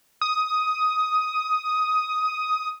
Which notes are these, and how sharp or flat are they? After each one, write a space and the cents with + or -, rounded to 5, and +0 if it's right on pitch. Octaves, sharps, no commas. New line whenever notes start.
D#6 +10